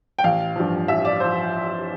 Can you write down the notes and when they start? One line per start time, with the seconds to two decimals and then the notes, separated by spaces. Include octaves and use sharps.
0.19 G5
0.24 A1 F5
0.56 G2 F3
0.88 A1 E5
1.05 D5
1.20 F3 C5